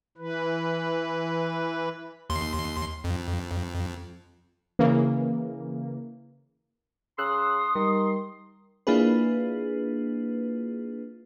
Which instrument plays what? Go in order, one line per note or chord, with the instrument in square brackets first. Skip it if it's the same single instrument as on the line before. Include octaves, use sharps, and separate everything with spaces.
[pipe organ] E3 B4
[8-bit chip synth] D#2 C6
F2
[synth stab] C#3 E3 A#3
[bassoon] C#3 [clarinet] C6 [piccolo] D#6 [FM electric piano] E6 F#6
[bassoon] D#3 [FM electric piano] G3
[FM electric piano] A#3 D4 E4 F4 G#4 B4